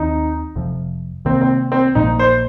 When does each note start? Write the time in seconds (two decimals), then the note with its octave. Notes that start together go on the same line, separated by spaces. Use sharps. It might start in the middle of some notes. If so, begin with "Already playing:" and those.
Already playing: D#2 D#3 C4 D#4
0.55 F1 F2 C3 F3
1.25 C2 C3 D#3 A#3 C4
1.41 C4
1.72 C4
1.95 A#1 A#2 F3 A#3 D#4
2.19 C5